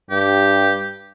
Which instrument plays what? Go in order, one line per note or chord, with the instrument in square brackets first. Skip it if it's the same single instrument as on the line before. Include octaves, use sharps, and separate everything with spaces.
[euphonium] G2 [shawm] G4